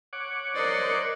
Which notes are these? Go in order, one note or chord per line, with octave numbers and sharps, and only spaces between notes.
C#5 F#5 D6
A#4 C5 D5 D#5